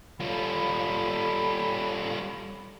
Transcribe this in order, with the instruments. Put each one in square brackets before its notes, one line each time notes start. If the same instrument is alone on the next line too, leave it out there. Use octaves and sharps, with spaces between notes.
[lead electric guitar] G3 F4 [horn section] A4 C#5 B5